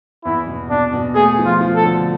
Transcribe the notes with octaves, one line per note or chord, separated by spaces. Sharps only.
E2 E4
B2
B2 D4
B2
A3 G#4
F3
F4
F3
A4
D3